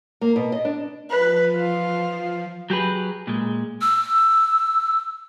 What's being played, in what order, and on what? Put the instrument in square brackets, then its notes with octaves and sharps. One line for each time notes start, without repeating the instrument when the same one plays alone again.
[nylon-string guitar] A#3
B2
D#5
D4
[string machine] F3 [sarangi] B4
[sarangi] F4
[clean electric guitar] F#3 G4 G#4 B4
A#2 G#3
[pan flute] E6